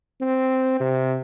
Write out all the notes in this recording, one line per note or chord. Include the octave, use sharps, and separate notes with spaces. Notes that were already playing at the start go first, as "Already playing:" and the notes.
C4
C3